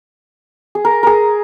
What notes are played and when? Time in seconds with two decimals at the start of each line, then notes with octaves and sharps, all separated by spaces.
0.75 G#4
0.85 A#4
1.03 G#4 A#4